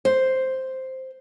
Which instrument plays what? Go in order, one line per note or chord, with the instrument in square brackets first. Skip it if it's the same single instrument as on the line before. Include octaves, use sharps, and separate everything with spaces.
[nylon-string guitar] C5